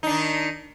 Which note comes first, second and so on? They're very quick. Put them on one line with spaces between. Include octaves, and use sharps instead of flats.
D#4 D4 D#3